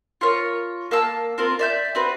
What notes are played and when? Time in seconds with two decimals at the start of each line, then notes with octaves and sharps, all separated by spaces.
0.21 F4 A#4 C#5
0.91 A#3 F5 A5 E6
1.38 C4 F4 A#4
1.59 D5 E5 G6
1.95 C4 F#4 B4